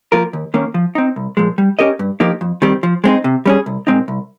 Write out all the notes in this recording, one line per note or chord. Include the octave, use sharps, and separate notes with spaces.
F3 A#3 F4 A#4
D#2
D#3 A#3 C#4
F3
C4 D#4
C2
A#2 F3 G#3
G3
C#4 G4 A#4 D#5
G2
F3 A#3 D#4 G4
F2
D#3 G3 C4 G4
F3
G#3 C4 D#4
C3
G3 C#4 G#4
C2
A#2 G#3 C4 D#4
C2